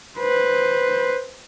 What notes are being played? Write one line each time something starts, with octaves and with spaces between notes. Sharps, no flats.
B4 C5